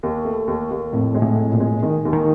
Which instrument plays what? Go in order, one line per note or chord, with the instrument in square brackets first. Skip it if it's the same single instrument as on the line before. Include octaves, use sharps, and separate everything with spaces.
[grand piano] D#2
A3
D#2
D#2
[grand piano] F2 [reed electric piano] A2
[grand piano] G#3
[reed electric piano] A2
[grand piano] F2
[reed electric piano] A#2
[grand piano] G#3
[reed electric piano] D#3 [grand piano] G#3
[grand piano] D#2
[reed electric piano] D#3